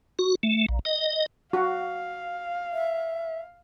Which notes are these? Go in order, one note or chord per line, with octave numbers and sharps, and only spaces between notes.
F#4
A3
A#1
D#5
F#4 F5
E5